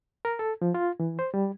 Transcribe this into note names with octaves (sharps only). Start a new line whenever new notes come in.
A#4
A4
F3
F4
E3
C5
G3